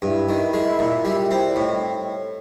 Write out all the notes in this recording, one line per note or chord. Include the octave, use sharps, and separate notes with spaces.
G2 E4 E5
D#3
G#3
A#2
G3
C4
D5
A2 D#4 D#5